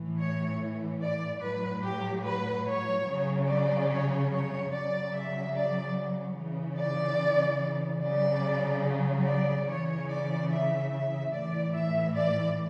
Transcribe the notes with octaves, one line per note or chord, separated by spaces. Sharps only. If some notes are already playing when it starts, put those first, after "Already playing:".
Already playing: A2 E3
C#5
D5
A2 F#3 B4
G4
B4
C#5
C#3 F#3
D5
C#5
C#5
C#3 F#3 D5
E5
D5
C#3 E3
D5
C#3 F#3 D5
D5
C#3 E3 C#5
D5
E5
E5
A2 E3 D5
E5
D5